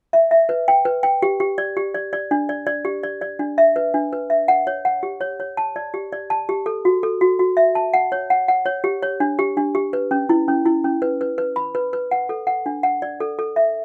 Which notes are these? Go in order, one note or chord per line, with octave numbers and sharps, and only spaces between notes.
E5
E5
B4
G5
B4
G5
G4
G4
D5
G4
D5
D5
D4
D5
D5
G4
D5
D5
D4
E5
B4
D4
B4
E5
F#5
C#5
F#5
G4
C#5
C#5
A5
D5
G4
D5
A5
G4
A4
F#4
A4
F#4
F#4
E5
A5
F#5
C#5
F#5
F#5
C#5
G4
C#5
D4
G4
D4
G4
B4
C#4
E4
C#4
E4
C#4
B4
B4
B4
B5
B4
B4
F#5
A4
F#5
D4
F#5
D5
A4
A4
E5